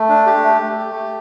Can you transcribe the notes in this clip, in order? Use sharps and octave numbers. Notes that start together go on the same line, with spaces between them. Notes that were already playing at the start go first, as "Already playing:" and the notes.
Already playing: A3
D4
G4
A3
A3
G4
A3